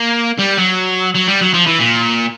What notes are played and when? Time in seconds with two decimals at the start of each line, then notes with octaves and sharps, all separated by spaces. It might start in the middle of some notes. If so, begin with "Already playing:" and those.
Already playing: A#3
0.39 G3
0.57 F#3
1.15 F#3
1.28 G3
1.41 F#3
1.54 F3
1.66 E3
1.79 A#2